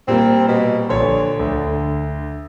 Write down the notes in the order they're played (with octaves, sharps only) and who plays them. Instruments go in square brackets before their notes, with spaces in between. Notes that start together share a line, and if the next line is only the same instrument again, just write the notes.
[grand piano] A#2 G3 A#3 [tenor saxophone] C4
[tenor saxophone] B2
[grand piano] A#1 C#5 C6 [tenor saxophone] D3
[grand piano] D2